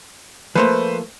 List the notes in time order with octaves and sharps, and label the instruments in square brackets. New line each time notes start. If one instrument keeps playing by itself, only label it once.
[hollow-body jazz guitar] F3 A3 A#3 [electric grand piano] B4 C5